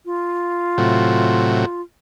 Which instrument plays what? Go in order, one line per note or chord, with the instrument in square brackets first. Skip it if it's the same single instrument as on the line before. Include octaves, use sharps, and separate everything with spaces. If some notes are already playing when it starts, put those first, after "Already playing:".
[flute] F4
[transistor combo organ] A2 C3 F#3